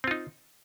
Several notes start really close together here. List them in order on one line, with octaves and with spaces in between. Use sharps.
C4 F4 D#4